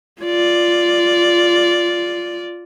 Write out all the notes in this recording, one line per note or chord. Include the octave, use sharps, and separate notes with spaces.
F4 D5